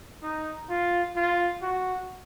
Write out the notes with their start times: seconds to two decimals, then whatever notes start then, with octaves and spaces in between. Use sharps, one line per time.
0.23 D#4
0.69 F4
1.16 F4
1.62 F#4